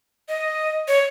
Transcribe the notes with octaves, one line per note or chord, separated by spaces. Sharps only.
D#5
C#5